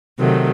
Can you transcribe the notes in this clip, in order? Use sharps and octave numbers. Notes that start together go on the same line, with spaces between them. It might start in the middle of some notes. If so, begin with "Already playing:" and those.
C3 D#3 F#3 A3